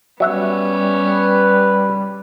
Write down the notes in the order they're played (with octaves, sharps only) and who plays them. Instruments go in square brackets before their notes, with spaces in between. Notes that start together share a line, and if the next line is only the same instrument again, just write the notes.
[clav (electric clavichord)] F#3 E5 F#5 [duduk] G3 [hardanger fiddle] B3 C#4
[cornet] B4